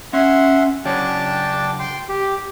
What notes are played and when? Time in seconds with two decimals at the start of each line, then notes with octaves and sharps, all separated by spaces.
0.13 C#4 E5 F#5 C6
0.85 C#3 F#3 D4 C#5 G5 A5
1.79 G5 C6
2.09 G4